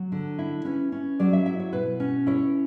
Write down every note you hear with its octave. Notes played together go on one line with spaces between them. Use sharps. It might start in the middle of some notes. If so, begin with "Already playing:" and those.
Already playing: F#3
D3
E4
C#4 B4
C#4
F#3 D5
E5
E4 E5
C#5
B2 B4
C#4
E4 C#5